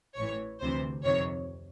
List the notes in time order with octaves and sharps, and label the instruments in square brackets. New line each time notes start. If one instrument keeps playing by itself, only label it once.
[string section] A1 A2 E3 C#5
D2 C3 E3 C5
F2 C3 D#3 C#5